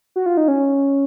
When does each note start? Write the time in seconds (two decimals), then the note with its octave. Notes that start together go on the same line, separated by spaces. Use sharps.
0.16 F#4
0.26 F4
0.37 D#4
0.48 C#4